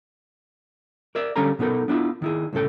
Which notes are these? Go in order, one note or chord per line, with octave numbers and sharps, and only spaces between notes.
A#4 D5 E5
D3 G3 C#4 A4 F5 A#5
B2 B3 D#4 A4 A#4
B3 D4 E4 F4
D#3 E4 G#4
C2 A2 C#3 A4 G5